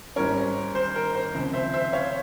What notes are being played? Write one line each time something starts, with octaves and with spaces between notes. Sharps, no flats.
G#1 G#2 G3 C#4 A#4 C#5
C5
A#4
C5
C#2 C3 F3
C5 E5
C5 E5
C#5 F5